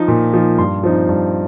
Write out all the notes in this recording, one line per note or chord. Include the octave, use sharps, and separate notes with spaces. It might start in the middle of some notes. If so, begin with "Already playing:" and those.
Already playing: F3 D#4
A#2
F3 D#4
G2 C6
F3 C4 D#4
G2